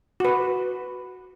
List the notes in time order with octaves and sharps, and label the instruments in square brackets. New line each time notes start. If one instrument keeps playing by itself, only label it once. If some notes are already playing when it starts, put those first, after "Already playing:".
[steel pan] F#4 B4